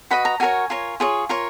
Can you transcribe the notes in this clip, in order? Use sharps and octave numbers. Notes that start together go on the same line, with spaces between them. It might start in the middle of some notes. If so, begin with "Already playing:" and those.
F#4 B4 D#5 B5
A#5
F#4 A#4 C#5 G#5
F4 A#4 C#5
F4 G#4 C#5
F4 A#4 C#5